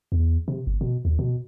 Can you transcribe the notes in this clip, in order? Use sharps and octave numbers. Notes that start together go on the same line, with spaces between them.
E2
C3
G1
B2
D#2
B2